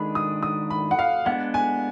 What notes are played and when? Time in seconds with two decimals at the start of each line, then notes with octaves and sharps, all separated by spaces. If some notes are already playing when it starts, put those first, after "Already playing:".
Already playing: D#3 G#3 D4 G#4 B5
0.15 D#6
0.43 D#6
0.70 B5
0.91 F#5
0.99 F5
1.26 G#3 B3 D4 F#5
1.54 G#5